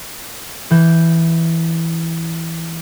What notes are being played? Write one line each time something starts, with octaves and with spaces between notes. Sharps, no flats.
E3 G6